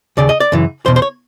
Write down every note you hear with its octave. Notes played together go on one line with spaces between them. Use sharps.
D#2 C#3 D5
D#5
D5
F#2 C#3 E3
E2 B2 C5
C5
C#5